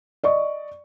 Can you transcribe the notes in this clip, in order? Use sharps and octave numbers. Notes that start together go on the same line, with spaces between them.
D5 D#5 C#6